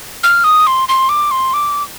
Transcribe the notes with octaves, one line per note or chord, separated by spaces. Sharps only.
F6
D#6
C6
C6
D6
C6
D6